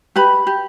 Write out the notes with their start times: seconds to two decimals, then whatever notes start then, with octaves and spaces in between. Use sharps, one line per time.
0.16 G4 B4 B5
0.47 G4